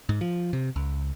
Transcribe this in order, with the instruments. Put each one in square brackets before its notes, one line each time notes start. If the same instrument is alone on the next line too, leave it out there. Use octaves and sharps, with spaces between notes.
[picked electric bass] G#2
F3
C3
C#2